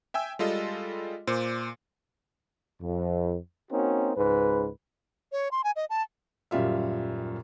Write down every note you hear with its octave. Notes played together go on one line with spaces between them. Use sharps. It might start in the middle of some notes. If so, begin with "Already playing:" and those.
E5 G5 G#5 E6
G3 G#3 F4 A4 D#5
A#2 C5 D6
F2
A#3 C4 C#4 D#4 F#4
C#2 G#2 B4
C#5
C6
G#5
D#5
A5
D#1 F#2 G3 F4 E5